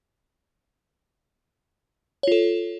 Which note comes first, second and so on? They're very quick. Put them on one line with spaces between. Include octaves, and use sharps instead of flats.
C#5 F4 A4